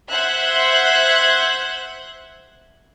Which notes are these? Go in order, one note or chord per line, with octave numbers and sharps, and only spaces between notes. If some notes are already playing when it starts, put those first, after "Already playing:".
C5 E5 F#5 F#6 G#6